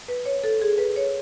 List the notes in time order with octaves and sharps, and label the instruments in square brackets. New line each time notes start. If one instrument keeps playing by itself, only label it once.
[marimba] B4
C#5
A4
G#4
B4
C#5